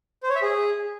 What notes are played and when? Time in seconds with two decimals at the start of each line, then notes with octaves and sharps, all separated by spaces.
0.23 C5
0.29 C#5
0.36 E5
0.42 G#4